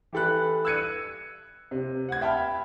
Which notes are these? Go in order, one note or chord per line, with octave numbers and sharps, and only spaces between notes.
E3 G4 A4 B5 F#6
E6 F#6 G#6 C#7 D#7
C3
F#5 G#6
E5 G5 A5 B5 F6